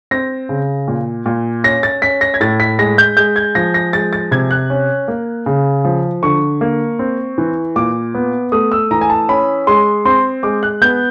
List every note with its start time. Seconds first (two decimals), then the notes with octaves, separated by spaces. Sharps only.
0.11 C4 A#6
0.49 C#3
0.88 A#2
1.26 A#2
1.64 C#4 A#6
1.83 A6
2.02 C#4 B6
2.21 A#6
2.34 G#6
2.40 A2 A6
2.60 B6
2.79 G#3 A#6
2.98 G6
3.17 G#3 G6
3.36 G#6
3.55 F3 A#6
3.74 A#6
3.93 G#3 A6
4.13 A6
4.31 C3 G#6
4.51 F#6
4.70 C#4
5.08 A#3
5.46 C#3
5.84 F3
6.23 D3 C#6
6.61 A#3
6.99 C4
7.38 E3
7.76 A#2 D6
8.14 B3
8.52 A3 D#6
8.72 E6
8.91 E3 A#5
9.01 G#5
9.10 A5
9.29 C#4 B5
9.67 G#3 C6
10.05 C4 C6
10.43 G#3 D6
10.63 F#6
10.82 B3 G6